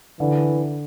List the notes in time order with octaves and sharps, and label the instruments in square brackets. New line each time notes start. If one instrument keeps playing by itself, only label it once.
[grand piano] D3 [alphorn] E3